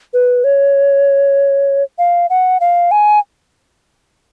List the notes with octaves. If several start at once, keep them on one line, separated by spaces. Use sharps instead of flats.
B4
C#5
F5
F#5
F5
G#5